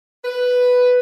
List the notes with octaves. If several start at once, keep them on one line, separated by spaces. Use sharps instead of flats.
B4